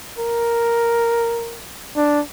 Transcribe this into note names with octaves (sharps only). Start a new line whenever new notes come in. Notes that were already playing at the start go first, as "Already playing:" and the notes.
A#4
D4